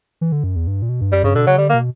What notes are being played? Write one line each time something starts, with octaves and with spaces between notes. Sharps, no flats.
E3
D3
F#2
E2
G2
A#2
B2
G2
F#2 G3
G2 C#3
B2 D3
C#3 F#3
D3 G3
A#3
B2